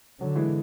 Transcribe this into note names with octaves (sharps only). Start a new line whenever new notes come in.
D3 F#3
E3 G#3